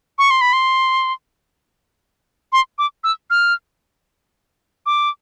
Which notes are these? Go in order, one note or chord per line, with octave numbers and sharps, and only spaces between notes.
C#6
C6
B5
C6
C6
D6
E6
F6
D6